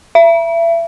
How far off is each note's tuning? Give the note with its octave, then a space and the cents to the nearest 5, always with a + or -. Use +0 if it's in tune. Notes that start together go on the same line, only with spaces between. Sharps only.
E5 +30